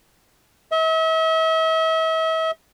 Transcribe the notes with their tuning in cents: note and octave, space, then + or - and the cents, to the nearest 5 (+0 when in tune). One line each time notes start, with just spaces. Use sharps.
E5 -40